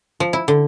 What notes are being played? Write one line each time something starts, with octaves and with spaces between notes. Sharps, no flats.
F3
E4
D3